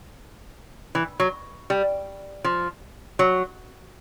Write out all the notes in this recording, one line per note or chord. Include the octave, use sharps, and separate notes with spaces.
E3
F#3
G3
F3
F#3